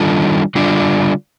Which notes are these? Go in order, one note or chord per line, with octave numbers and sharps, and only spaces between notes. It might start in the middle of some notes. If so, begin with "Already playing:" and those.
Already playing: D#3 G3 D4 F4 A4
D3 G3 D4 F4